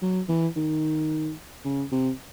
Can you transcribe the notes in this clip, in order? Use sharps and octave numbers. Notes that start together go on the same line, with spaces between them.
F#3
E3
D#3
C#3
C3